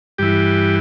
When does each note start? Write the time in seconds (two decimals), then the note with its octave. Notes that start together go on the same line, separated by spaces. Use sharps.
0.18 G2 E3 G4